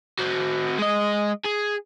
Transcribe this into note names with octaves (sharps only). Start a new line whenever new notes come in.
C4 F#4
G#3 D#5
G#4